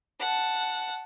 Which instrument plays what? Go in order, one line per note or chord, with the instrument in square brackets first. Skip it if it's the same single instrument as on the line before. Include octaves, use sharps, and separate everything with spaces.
[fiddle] F#5 A5